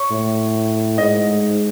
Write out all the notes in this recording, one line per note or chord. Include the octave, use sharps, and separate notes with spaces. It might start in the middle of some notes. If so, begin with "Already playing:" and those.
Already playing: C#5
A2
G#2 D#5